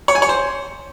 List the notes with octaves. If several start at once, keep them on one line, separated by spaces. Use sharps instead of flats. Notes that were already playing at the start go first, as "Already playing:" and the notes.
C#5
G#5
C#5
C5